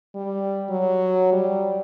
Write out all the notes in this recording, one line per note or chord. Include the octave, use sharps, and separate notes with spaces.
G3
F#3
G3